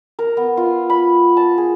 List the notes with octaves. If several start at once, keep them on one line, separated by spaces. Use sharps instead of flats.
A#4
B3
F4
B5
A5
G#4